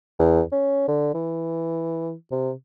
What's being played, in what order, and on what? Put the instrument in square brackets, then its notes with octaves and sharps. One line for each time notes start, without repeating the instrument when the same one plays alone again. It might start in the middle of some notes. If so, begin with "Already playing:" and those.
[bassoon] E2
C#4
D3
E3
C3